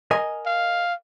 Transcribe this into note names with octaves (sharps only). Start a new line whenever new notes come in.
A#4 D#5 G#5
F5